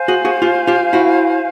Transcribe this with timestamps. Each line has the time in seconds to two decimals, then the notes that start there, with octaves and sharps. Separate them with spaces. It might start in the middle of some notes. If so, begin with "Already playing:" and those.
Already playing: C5 F5 G#5
0.08 F#4 G#4
0.25 F#4 G#4
0.42 F4 G4
0.67 F4 G4
0.93 E4 F#4